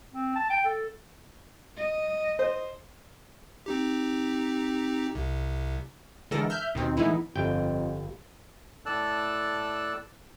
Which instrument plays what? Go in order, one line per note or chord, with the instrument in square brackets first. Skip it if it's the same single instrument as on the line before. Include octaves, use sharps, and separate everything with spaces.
[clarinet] C4
A5
G5
A4
[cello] D#5
[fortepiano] C5
[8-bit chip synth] C4 D#4 G4
C2 C3
[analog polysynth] D3 E3 G#3 A4 A#4 A#6
E5 F6 G6
D#2 B2 D#3 C4
A2 E3 G#3 B3 D#4 E4
[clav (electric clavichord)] G1 G5 [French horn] F2
[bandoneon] A2 A4 D5 A5 E6 F#6